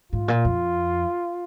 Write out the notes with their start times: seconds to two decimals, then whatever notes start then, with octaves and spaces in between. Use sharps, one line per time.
0.12 G#2 F4
0.28 A#2
0.45 F2